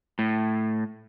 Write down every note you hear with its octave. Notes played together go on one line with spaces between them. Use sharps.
A2